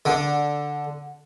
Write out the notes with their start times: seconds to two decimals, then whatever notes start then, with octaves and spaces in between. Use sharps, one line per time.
0.05 D3